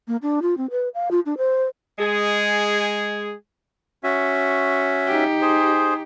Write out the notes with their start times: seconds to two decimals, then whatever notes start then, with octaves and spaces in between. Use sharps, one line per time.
0.08 A#3
0.22 D4
0.42 F4
0.57 C4
0.71 B4
0.94 F5
1.11 F4
1.26 D4
1.37 C5
1.99 G#3 G#4
4.04 C#4 F#4 E5
5.07 D#4 G4
5.42 G#4 C5